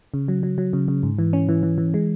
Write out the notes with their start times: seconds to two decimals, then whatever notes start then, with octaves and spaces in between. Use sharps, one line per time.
0.14 C#3
0.28 F#3
0.43 F#3
0.58 F#3
0.73 C#3
0.88 C#3
1.03 G#2
1.19 E3
1.33 C#4
1.49 E3
1.63 E3
1.78 E3
1.94 G#3